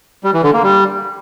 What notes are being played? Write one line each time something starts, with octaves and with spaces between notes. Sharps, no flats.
G3
E3
D3
A#3
G3